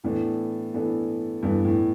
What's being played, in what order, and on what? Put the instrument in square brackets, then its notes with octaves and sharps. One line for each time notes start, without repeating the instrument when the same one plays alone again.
[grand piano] A2 [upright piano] E3 B3 D4 A4
[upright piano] E3 B3 D4 A4
[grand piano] G2 [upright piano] E3 B3 D4 A4
[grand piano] A2